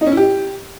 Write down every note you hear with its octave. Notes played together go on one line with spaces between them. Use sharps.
D#4
C#4
E4
G4